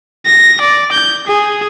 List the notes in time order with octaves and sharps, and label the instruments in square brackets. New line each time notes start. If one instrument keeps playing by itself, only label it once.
[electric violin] A#6
D5
G6
G#4